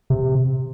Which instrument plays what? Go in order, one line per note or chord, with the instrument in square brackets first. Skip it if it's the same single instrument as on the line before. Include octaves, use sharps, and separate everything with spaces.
[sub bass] C3